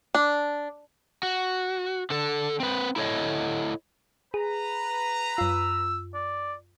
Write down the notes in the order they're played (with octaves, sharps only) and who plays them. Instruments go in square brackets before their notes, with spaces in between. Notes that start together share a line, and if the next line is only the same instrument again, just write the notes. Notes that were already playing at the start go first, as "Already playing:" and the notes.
[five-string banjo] D4
[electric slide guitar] F#4
D3 A4
C4 B4
E4 A4 C#5 D#5
[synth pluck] G#4 [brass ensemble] B4 A#5
[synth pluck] F#2 F4 [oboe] E6
[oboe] D5